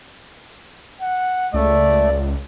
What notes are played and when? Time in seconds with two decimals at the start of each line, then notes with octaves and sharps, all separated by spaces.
1.01 F#5
1.54 C#2 A3 D5